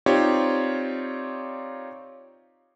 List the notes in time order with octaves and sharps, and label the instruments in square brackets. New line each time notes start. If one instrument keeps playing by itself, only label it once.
[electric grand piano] C4 D#4 F4 G4 C#5 D5